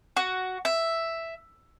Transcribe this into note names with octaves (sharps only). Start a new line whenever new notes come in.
F#4
E5